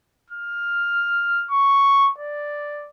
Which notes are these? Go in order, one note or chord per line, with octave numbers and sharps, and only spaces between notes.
F6
C#6
D5